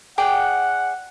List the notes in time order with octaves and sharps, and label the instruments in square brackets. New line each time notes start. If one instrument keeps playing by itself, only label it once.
[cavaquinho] G#4 D5 G5 [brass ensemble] F#5